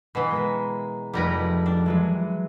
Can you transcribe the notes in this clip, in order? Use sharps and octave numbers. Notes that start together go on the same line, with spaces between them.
B2 E3
G#3 A#4 B6
F1 F2 G3 A#4 B4 A#6
D4
E3 F#3 G#3